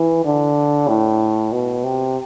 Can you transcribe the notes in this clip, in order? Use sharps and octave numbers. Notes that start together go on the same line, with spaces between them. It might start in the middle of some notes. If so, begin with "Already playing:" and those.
Already playing: E3
D3
A2
B2
C3